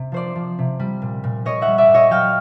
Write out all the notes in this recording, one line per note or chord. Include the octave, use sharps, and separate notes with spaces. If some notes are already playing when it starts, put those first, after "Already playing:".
Already playing: C3
F3 C5 D5
F3
C3
G3
A#2
A#2
G3 C#5 D#5
E5 F#5
G3
D5 E5
A#2
C#5 D#5
F#3 F5 G5